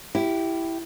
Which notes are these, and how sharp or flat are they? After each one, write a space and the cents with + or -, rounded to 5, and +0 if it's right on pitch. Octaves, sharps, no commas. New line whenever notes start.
E4 +0 G4 -5